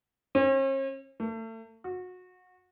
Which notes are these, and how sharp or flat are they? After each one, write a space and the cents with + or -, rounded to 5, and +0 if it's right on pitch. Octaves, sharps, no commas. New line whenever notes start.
C#4 -45
A3 +35
F#4 -25